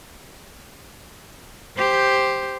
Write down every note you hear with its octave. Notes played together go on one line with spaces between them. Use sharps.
G4 C5